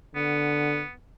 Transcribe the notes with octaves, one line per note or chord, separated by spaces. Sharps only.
D3 B3